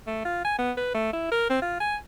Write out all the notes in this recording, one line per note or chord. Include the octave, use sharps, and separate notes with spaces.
A3
F4
G#5
B3
B4
A3
E4
A#4
C4
F4
G#5